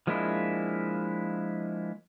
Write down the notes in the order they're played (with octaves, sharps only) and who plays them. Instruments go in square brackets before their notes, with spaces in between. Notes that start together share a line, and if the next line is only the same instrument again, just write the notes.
[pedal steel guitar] F3 G#3 A#3 D4 E4